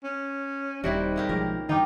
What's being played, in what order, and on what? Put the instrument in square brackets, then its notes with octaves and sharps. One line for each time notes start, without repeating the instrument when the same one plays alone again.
[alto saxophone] C#4
[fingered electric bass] D#1 [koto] C3 E4 F#4 [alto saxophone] G3 [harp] D#4
[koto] G#3 A#3 G4
[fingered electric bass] B1 F3 G#3 [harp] C#4 G4 [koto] A#4
[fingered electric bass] G2 D#3 [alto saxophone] D#4 [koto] F4 [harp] G5 A#5 D6